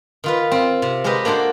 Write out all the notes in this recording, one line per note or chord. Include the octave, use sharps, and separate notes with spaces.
D#3 F4 B4
C4 F4
C3
G#3 G4 A#4 B4 D#5
A#3 D4 F#4 A4 C5